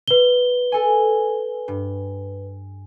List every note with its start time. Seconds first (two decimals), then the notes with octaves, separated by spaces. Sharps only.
0.08 B4 G7
0.72 A4 G#5
1.68 G2